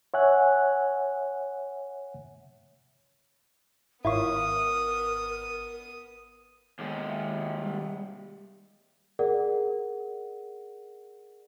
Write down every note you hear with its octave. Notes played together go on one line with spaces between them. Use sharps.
C#5 E5 F#5 G#5 F#6
G#1 B3 E4 F4 A#4 C#5 D#6
D#2 G#3 B3
E5
G3
G#4 A#4 D5 F#5